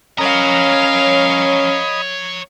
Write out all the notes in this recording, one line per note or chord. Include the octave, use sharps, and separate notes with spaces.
C#4 A#4 C#5 D#5 F5 A#5 B5 D#6